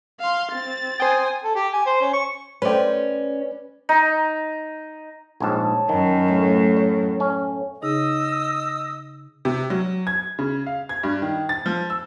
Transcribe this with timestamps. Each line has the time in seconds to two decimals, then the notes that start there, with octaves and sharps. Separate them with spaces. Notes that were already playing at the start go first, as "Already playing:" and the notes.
0.20 F5 C6
0.52 C4 A6
1.00 C5 G5 G#5 D#6
1.44 A4
1.55 G4
1.73 G#5
1.86 C5
2.01 C#4
2.13 C#6
2.62 A3 C#4 B4 C5 D5 G5
3.89 D#4
5.40 A#1 G#2 C#5 A5
5.89 F#2 D#3
6.28 A2
6.77 C#5
7.20 C#4
7.82 C#3 D#4 G#4 D#5 D#6 E6
9.45 C3
9.70 F#3
10.07 G#6
10.39 C#3
10.66 F5
10.89 G#6
11.03 G2
11.22 D#3
11.49 A6
11.66 F3
11.90 E6